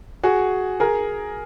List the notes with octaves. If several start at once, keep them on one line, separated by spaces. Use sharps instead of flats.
F#4 G#4
G#4 A#4